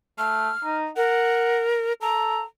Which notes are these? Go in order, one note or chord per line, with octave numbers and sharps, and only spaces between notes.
A3 F6
D#4
A#4 F#5
A4 A#5